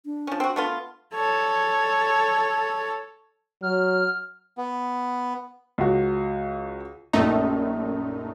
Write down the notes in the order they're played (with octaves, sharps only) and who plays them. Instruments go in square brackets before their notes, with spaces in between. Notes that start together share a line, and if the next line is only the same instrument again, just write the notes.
[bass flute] D4
[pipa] F3 C#4
C4 F#4
A3 B3 F4
[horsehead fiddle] A4 C#5
[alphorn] F#3 [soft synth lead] F6
[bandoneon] B3
[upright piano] C#2 F#4
[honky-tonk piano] A#1 F#2 [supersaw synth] A3 D#4